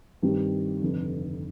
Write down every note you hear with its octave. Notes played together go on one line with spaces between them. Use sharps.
G2 D#3 G3 C4 G4
F1 F2 D3